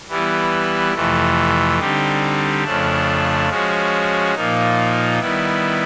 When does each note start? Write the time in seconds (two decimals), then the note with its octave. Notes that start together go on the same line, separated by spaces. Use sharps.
0.08 E3 G3 B3 E4
0.94 F2 C3 E3 A3
1.79 D3 G3 C4 D#4 G4
2.64 F2 C#3 F3 A3 D4
3.49 F3 G#3 C#4 F#4
4.35 A#2 F3 A#3 D#4
5.20 D#3 G3 B3 E4